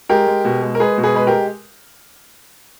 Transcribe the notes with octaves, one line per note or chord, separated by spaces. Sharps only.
G#3 G4 A#4
G#3
B2
G#3
A#4
G#3 G#4 B4
B2
G#4 B4
G#3 B4
G4 A#4
G#3